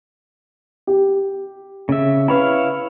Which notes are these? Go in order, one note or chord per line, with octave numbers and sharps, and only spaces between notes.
G4
C#3 E5
E4 B4 C#5 F5 B5